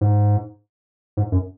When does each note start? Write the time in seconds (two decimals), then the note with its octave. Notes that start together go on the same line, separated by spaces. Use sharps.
0.01 G#2
1.17 G#2
1.32 F#2